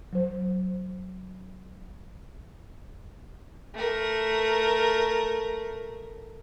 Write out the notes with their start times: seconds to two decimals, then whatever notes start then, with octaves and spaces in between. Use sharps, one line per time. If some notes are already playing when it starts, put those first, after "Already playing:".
0.13 F#3 C5
3.74 A3 A#4